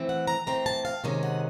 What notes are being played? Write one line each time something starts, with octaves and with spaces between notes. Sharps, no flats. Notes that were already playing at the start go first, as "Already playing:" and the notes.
Already playing: E3 A3 C4
F#5
A#5
E3 A3 C4 A#5
A5
F5
C3 D#3 G#3 C#4
F#5